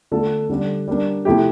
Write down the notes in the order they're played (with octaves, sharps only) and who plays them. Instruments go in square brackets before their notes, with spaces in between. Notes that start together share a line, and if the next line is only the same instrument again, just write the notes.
[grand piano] D3 A3 D4 F4 A4
D3 G3 D4
G3 A#3 D4
C3 F3 A3 E4 G4